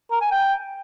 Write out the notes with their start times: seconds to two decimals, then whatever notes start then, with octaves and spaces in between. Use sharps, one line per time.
0.11 A#4
0.21 G#5
0.31 G5